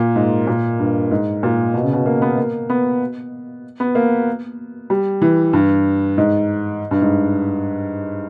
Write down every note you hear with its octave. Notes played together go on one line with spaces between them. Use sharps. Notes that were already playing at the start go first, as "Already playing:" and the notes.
Already playing: A#2
G#2
A#2
G2
G#2
A#2
B2
C#3
B2
A#3
B3
A#3
B3
B3
A#3
G3
E3
G2
G#2
G2
G#2